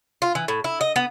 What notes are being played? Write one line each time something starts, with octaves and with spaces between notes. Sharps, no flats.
F4
E3
A2
E4
D#5
B3